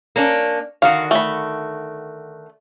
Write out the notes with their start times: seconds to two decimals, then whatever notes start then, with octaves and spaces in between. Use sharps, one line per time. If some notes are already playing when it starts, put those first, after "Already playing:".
0.16 A#3 C#4 D4
0.82 D3 D#3 F#4 F5
1.11 A3 B5